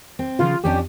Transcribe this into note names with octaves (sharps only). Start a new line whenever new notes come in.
C4
C#3 E3 F3 F4
F2 C#4 D4 G4